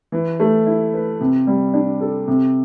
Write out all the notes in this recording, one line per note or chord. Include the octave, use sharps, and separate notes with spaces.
E3
A3
E4
B4
C3
G3
D4
A4
C3